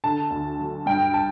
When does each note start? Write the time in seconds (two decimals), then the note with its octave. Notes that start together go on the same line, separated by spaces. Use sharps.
0.04 D3 A5
0.30 D2
0.59 F#3
0.86 G2 G5
1.14 A5